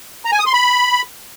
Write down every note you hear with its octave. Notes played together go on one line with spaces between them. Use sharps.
A#5
G#5
D#6
C6
B5